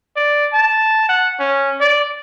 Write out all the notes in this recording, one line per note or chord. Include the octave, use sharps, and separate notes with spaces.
D5
A5
F#5
C#4
D5